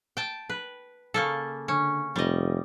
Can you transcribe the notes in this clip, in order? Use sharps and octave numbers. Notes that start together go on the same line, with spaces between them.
G5 A5
B4
C#3 A#3 A4
D3 C#4
F1 G3 D#5